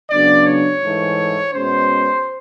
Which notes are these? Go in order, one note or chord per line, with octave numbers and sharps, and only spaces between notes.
C#3 F#3 B3 D4 D5
C#5
G#2 E3 A3
B2 G#3 C#4 C5